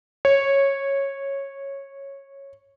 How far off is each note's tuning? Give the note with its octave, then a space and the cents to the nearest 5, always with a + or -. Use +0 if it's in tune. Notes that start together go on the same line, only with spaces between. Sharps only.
C#5 -10